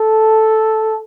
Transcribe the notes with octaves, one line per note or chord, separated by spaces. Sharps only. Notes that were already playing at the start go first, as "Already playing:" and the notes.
Already playing: A4